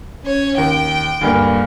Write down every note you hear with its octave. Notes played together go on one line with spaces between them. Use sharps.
C#4 C#5
D#2 G5
D2 G2 A#3